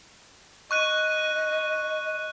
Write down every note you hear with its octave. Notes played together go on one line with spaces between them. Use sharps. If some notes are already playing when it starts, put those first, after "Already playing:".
D#5 C#6 F#6 D#7